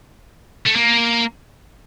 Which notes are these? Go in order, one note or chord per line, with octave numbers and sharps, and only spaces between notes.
A3
A#3